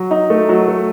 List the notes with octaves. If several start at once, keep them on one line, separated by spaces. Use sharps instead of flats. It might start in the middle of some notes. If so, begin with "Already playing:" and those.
Already playing: F#3
D#4
A3
F#3
A3